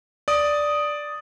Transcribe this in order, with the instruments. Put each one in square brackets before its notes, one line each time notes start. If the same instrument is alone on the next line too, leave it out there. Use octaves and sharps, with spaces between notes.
[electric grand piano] D5 D#6